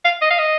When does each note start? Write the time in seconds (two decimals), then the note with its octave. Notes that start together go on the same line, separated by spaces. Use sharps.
0.05 F5
0.22 D#5
0.30 F5
0.39 D#5